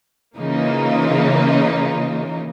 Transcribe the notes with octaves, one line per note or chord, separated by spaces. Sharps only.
C#3 E3 A#3 D#4 F4